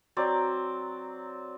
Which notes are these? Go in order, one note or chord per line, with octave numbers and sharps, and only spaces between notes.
F#3 C4 D5